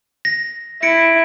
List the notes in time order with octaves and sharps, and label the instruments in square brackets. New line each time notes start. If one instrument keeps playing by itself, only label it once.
[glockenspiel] A#6
[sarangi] E4 [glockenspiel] A#6 C#7 D7